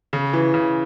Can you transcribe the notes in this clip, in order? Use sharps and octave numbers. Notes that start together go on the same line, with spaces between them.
C#3
E3
C#3